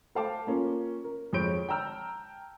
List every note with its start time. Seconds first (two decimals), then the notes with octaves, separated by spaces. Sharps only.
0.15 A4 C5 F5 G5 A5 D6
0.47 A#3 C#4 F4
1.04 A#4
1.33 F2 G#3 C#5 G6 D7
1.68 G5 A5 A#5 E6 F6 G6